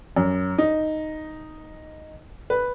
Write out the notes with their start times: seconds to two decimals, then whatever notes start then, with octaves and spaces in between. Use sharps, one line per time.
0.16 F#2
0.58 D#4
2.50 B4